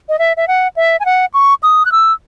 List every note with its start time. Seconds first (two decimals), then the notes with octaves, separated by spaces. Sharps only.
0.09 D#5
0.19 E5
0.37 E5
0.48 F#5
0.76 E5
1.00 G#5
1.05 F#5
1.34 C#6
1.63 D#6
1.85 F#6
1.92 E6